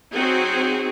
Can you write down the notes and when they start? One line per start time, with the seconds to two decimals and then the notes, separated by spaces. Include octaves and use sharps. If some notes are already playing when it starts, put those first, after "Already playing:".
0.13 F#3 C4 D#4 F#4 G#4